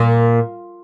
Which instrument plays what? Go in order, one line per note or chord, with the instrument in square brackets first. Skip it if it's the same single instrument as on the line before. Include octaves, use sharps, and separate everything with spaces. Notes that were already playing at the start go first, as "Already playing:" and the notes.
Already playing: [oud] A#2